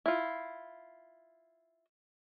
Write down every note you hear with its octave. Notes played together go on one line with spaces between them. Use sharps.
E4 F4